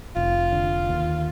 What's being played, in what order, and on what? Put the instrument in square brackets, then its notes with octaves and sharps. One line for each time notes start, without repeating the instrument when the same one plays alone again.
[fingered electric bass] F1 [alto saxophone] F4
[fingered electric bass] D3
D#2